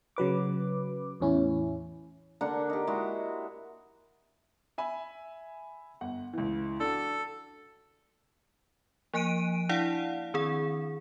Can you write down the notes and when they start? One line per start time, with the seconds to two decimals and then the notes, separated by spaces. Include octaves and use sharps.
0.16 C#3 F#3 B4 D6
1.20 E2 A2 C#4 E4
2.41 D3 A#3 D4 F#5
2.70 D#4 G4
2.87 G#3 E4 F#4
4.78 E5 G#5 B5
6.01 G1 F#5
6.33 C#2 E3
6.80 D4 F#4 A4
9.14 F3 A#3 G#5 F#6 D7 D#7
9.69 D4 E4 D5 F5 F#5
10.34 D#3 C4 G#4